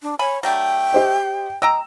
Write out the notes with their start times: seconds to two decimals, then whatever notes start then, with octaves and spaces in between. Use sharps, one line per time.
0.02 D4
0.19 C#5 G#5 B5
0.43 F#3 A3 D4 G5
0.93 G4 C5 D#5
1.62 D#5 G5 A#5 E6